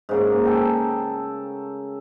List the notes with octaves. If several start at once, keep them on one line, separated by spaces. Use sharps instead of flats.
G#2 C#3 A#3
A4 G5 A#5